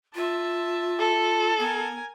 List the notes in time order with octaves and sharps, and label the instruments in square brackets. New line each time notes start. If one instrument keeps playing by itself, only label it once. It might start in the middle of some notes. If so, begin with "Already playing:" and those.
[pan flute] F4 [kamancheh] E5 A5
[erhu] A4
[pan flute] B3 [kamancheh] A#4 G#5